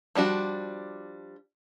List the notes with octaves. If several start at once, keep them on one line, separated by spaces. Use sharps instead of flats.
F3 G3 D4 F#4